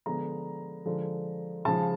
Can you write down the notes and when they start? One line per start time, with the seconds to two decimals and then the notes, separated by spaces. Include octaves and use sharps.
0.06 D3 F3 G#3 B3 A#5
0.86 D3 F3 G#3
1.65 C#3 F3 G#3 A5